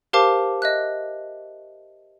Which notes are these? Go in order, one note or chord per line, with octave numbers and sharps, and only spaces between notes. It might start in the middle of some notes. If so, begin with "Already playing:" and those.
G4 A#4 C5 F5 A5 D6
D#5 E5 F#6